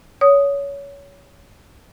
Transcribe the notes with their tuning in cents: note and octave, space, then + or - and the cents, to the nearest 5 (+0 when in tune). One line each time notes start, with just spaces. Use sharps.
C#5 +20 D#6 +0